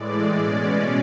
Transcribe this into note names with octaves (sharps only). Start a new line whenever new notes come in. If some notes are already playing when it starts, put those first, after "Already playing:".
Already playing: A2 E3 G#3 D5
B2 G#3 C#4 D5